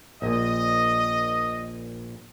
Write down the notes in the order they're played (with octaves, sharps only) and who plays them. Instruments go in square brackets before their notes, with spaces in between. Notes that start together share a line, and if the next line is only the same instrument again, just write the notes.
[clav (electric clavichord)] A#1 A#2 [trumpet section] D#5